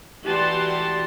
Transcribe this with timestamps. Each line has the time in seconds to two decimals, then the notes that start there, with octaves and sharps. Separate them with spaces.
0.24 E3 F#4 G4 D5 A5 C6